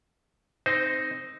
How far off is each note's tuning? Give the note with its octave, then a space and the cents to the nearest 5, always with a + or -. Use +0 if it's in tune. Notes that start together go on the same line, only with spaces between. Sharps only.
C4 +0 D#4 +0 C5 -20